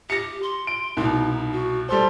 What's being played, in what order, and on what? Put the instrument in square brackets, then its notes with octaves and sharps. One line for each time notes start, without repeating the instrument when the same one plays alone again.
[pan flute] G4 [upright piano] A#6 C#7
[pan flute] C6
[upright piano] D7
[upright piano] C2 B2 [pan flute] D#4
[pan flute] F#4
[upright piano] G3 A4 C5 [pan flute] C6